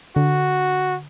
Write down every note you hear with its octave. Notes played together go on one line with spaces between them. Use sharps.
D3 F#4